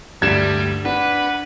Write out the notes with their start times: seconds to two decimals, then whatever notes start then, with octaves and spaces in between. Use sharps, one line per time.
0.22 D2 G2 G3 G#6 E7
0.85 D4 B4 F#5